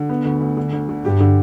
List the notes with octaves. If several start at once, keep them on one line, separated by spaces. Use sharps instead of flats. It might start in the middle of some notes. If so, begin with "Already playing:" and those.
Already playing: D3
B3
D2
D2
D3
D2
D3
G2 G4
D3